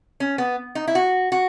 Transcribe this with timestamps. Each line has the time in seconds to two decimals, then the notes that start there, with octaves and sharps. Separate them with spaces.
0.20 C#4
0.38 B3
0.75 D#4
0.87 E4
0.95 F#4
1.32 F#4